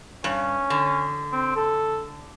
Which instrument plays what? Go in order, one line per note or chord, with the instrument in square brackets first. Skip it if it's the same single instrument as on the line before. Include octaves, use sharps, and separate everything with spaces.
[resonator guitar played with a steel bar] G2 [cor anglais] C#4
[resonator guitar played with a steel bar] D3
[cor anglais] C4
A4